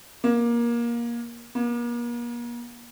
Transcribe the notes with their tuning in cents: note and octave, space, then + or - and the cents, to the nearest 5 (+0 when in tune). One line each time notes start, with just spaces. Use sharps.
A#3 +20
A#3 +40